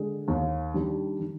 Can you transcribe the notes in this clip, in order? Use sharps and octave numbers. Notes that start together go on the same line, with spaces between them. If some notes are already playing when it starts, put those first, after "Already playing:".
Already playing: D3 G#3
D#2
D#3 G3 D4
D#3